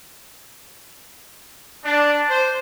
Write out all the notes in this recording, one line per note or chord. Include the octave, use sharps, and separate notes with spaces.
D4
C5